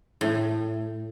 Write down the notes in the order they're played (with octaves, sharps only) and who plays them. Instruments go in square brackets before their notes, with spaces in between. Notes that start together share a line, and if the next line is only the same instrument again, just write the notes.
[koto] A2